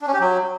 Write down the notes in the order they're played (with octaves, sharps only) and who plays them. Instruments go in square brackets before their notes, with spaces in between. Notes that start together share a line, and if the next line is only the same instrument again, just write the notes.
[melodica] D4
C#4
G4
F#3